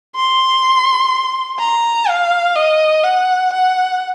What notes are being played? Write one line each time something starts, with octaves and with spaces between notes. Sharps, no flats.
C6
A#5
F5
D#5
F#5
F#5